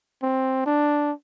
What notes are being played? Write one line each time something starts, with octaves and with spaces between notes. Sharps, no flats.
C4
D4